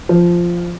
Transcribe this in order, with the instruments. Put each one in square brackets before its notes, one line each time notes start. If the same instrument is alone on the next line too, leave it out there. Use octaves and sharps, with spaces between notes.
[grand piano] F3